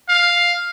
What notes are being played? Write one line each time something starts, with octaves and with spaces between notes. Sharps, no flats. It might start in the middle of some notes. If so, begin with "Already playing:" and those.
F5